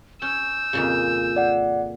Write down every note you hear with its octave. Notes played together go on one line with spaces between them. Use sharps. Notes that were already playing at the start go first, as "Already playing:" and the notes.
C#4 E6 G6
F2 A#2 C#3
D5 F#5